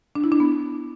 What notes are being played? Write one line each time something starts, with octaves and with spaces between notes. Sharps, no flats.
D4
E4
D4
B3